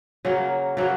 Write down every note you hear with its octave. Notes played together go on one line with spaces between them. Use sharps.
C#3 F#3 A#3
C#3 F#3 A#3